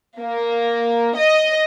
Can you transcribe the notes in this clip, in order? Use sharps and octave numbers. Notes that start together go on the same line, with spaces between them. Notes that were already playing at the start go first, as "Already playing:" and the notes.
A#3
D#5